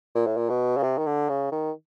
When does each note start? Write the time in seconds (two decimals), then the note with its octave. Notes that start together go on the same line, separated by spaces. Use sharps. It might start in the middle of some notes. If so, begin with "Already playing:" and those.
0.15 A#2
0.26 A2
0.37 A#2
0.50 B2
0.77 C#3
0.83 C3
0.98 D#3
1.06 D3
1.29 C#3
1.52 D#3